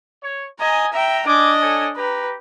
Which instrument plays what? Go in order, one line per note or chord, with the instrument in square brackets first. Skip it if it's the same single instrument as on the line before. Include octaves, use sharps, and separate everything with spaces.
[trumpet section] C#5
[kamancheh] D#5 A#5 [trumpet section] G#5
[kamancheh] E5 G5 [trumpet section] A#5
[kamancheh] D4 D#5 [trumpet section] G#5 D6
[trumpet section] A4 C#5 G#5
[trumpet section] G4 A#5 [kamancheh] B4